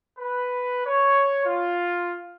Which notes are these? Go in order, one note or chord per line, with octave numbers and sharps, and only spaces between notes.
B4
C#5
F4